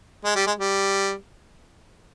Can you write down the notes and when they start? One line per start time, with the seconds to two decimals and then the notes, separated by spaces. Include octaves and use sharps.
0.25 G#3
0.35 G3
0.47 G#3
0.59 G3